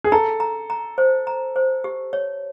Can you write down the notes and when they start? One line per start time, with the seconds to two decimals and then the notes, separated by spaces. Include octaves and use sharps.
0.04 G#4
0.12 A4 A#5
0.40 A#5
0.70 A#5
0.98 C5
1.27 A#5
1.56 C5
1.84 G4
2.13 C#5